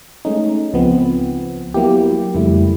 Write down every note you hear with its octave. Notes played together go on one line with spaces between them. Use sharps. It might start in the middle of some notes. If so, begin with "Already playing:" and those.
G#3 A3 C#4 D#4
C#2 F3 B3 C4
F#3 A#3 B3 E4 G4
F#3
F2 C#3 G3 A3 E4